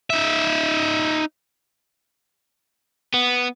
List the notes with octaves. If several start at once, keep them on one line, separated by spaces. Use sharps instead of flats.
D#4 E5
B3